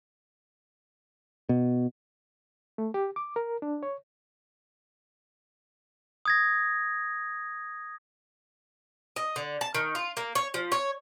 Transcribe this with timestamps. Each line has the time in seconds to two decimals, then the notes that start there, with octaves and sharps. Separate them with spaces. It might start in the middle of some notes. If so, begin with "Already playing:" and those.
1.49 B2
2.78 A3
2.94 G4
3.16 D6
3.36 A#4
3.62 D4
3.83 C#5
6.25 D#6 G#6 A#6
9.16 D#5
9.36 D3
9.61 A5
9.75 D#3
9.95 F4
10.17 A#3
10.35 C#5
10.54 F3
10.72 C#5